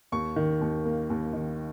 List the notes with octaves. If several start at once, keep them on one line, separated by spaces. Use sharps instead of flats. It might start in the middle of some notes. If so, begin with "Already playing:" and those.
D#2 C#6
D#3
D#2
A#3
D#2
D#3